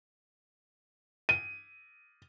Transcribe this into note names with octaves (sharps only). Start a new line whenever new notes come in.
D#7